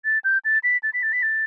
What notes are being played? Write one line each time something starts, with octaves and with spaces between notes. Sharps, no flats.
A6
G6
A6
B6
A6
B6
A6
B6
A6